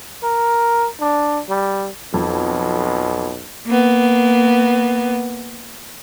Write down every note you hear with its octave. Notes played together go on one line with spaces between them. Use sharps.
A#4
D4
G3
B1 F2
A#3 B3